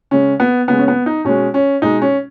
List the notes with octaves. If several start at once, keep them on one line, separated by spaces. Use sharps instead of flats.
C#3 G#3 C#4
B3
C#3 G#3 B3
C#4
B3
D#4
B2 G#3 C#4
C#4
B2 G#3 D#4
C#4